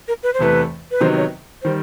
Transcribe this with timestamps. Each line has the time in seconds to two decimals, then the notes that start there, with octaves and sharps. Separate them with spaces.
0.08 A#4
0.23 B4
0.34 C5
0.39 E2 C3 E3 A3 B4
0.91 B4
1.00 C3 D#3 F#3 B3 D#4 C5
1.17 C#5
1.62 D#3 G3 C5